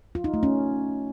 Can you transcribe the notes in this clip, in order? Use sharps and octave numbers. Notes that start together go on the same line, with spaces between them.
F4
D#4
A3
C#4